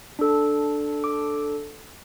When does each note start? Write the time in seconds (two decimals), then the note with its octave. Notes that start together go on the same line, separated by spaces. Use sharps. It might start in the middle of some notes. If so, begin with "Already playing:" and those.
0.19 D4 A4
1.04 D6